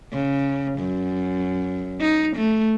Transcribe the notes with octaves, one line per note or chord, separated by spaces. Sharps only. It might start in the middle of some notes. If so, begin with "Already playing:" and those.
C#3
F#2
D#4
A3